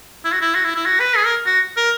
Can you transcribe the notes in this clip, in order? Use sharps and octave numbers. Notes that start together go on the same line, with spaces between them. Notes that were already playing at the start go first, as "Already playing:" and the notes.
E4
F#4
E4
F#4
E4
E4
F#4
B4
G#4
A#4
F#4
A#4